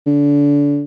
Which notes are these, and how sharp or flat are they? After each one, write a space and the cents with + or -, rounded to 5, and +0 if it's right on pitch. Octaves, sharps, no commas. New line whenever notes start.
D3 -30